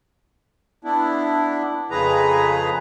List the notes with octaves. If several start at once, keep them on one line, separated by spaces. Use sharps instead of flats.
B3 D4 E4
F2 C#3 F3 G#4 B4 A#5